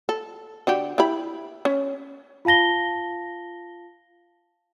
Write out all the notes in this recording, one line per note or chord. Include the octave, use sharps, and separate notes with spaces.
A4
D3 F#4 G4
E4 G4 B5
C#4
F4 F5 A5 A#6 G7